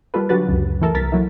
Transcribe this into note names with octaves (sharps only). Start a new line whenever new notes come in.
G3 A#3 F4 A4 B4
D3 F#3 F#4 G4 B4 A6
C#2 F#2 C#3
E3 A3 A4 A#4
C2 A#4 A6 B6
F#3 A#3 E4